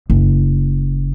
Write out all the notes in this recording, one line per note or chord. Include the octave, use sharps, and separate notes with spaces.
F#1